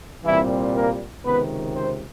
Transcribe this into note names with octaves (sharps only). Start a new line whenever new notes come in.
C2 A#2 E3 G3 C4 E4
A#3 A#4
C#2 C3 D#3 B3 B4
C4 C5